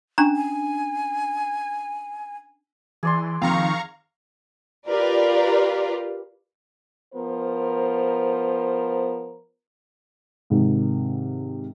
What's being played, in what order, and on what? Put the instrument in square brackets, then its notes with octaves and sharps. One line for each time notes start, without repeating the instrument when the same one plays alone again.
[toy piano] C#4 D4 A#5
[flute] G#5
[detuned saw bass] E3 [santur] G#4 D5 C6
[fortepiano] F2 [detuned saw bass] D#3 [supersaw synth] F5 A#5 C#6
[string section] F4 G4 A#4 B4 D5
[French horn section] F3 B3 A#4 C5
[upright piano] G#2 C3 D#3